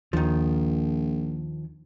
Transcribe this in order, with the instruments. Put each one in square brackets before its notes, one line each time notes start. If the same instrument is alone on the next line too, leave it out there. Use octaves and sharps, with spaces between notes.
[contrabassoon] A#1 [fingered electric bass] D#2 [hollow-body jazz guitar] D#3 F3